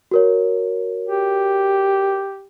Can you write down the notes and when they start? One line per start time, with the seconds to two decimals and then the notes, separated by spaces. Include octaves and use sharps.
0.11 F#4 A#4 C#5
1.08 G4